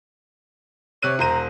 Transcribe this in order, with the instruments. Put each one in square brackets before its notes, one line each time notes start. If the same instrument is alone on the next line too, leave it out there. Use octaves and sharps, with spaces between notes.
[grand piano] C3 F#6 D#7 [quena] C#5
[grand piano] E1 C5 D#7 [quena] A#5